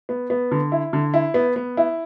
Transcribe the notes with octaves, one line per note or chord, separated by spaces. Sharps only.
B3
B3
D3
E4
D3
E4
B3
B3
E4